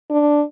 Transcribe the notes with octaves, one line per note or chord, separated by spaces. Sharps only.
D4